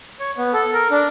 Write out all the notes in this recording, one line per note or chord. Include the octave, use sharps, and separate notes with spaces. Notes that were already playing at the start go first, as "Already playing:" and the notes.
C#5
B3
A4
A#4
D4